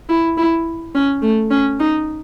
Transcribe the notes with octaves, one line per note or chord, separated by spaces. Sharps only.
E4
E4
C#4
A3
C#4
D#4